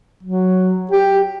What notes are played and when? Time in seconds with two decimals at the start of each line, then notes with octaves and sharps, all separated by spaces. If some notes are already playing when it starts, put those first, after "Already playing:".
0.23 F#3
0.91 G4